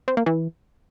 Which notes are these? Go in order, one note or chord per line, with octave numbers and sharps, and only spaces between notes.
C4
A#3
E3